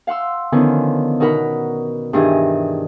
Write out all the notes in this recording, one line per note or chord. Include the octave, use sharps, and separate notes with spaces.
F5 F#5 C6 E6
D3 D#3 F3 B3 C#4
B2 D#4 F#4 A#4 F#5 B5
G2 D#3 E3 D4 G#4 D#5